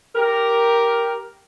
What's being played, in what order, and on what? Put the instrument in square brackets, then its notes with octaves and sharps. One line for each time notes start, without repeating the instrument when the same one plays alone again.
[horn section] G4 A#4